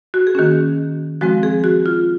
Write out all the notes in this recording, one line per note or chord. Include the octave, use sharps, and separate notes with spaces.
F#4
G#4
D#3 A#3 C#4 F#4
F3 G#3 C4 F#4
G#4
F#4
F4